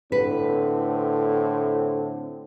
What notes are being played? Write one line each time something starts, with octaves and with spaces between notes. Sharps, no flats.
A2 D3 C4 B4